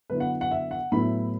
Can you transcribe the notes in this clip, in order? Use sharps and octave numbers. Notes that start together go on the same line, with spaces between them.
D3 F#3 B3 E4 B4
F#5
F#5
E5
F#5
A2 F#3 B3 E4 B5